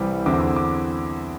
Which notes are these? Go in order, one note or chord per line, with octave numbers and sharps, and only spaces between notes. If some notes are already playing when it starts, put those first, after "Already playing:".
Already playing: C2 C3 E3 G3
E2 D3 C4 E4 D6
D6
D6